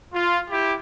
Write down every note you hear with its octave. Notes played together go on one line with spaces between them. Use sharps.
F4
E4 G4